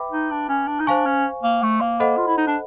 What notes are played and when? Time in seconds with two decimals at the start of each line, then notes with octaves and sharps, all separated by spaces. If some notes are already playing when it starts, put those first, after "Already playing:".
Already playing: B4 E5 G5 B5 D6
0.11 D#4
0.31 D4
0.49 C#4
0.67 D4
0.79 D#4
0.87 D4 C5 F5 G#5 C#6
1.06 C#4
1.43 A#3
1.63 A3
1.81 A#3
2.00 A4 C5 D#5 F#5 B5
2.17 F4
2.27 E4
2.37 D#4
2.47 D4